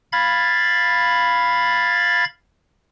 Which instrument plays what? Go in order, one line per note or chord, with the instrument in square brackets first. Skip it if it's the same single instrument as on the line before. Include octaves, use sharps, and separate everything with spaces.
[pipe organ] F5 B5 G#6 A6